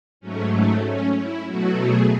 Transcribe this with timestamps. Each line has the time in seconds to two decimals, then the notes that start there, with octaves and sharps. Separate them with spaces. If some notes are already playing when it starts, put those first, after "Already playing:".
0.20 G#2 F#3 A3 C#4
0.52 A3
0.83 C#4
1.16 E4
1.47 B2 F#3 A3 F#4
1.79 G#4